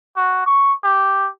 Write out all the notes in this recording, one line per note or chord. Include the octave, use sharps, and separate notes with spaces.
F#4
C#6
G4